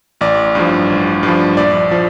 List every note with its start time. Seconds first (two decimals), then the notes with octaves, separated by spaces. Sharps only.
0.21 A1 D5
0.55 G2 F3
0.90 A1
1.23 G2 F3
1.57 A#1 D5
1.91 F3